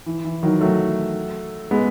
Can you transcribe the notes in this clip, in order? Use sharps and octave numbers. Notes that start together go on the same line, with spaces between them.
E3
E3
D#3 F#3
F#3 A3
G#3 B3